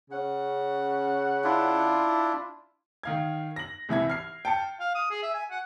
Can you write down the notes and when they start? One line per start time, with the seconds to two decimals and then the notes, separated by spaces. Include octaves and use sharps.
0.11 C#3 C#4 F#5
1.44 D4 E4 F4
3.03 D#3 F5 G#6
3.56 A#6 F#7
3.89 C2 E3 E5 G#6
4.10 F6 C7
4.45 G5 A5 C#7
4.80 F5
4.95 D#6
5.11 G#4
5.23 E5
5.34 G#5
5.51 F#5